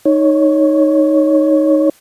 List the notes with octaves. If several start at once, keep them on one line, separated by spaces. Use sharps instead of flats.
D#4 C#5